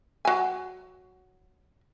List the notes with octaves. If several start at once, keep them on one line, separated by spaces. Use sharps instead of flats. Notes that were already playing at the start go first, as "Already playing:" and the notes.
F#3 G#5